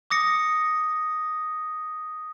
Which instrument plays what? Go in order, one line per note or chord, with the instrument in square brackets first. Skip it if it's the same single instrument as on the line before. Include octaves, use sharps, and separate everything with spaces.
[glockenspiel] D6 D#6 A#6 C#7